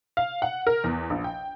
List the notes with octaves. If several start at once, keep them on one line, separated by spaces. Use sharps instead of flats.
F5
F#5
A#4
E2
A#1
G5